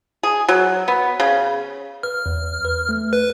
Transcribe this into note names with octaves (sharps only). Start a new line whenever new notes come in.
G#4
F#3
B3
C#3
B4 F6
E2
B4
A3
B4